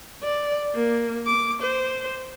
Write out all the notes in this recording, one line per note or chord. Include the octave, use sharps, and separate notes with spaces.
D5
A#3
D6
C5